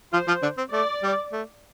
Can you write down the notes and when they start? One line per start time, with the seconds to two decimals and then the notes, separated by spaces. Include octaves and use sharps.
0.13 F3 F4 C5
0.28 F3 F4
0.42 D3 D4
0.58 C4
0.73 A3 D5
1.03 G3
1.32 A3